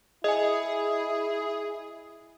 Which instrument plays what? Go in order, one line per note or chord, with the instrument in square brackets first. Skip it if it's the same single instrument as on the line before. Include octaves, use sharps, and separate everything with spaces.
[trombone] E4 [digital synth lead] G#4 [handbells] D#5 G#5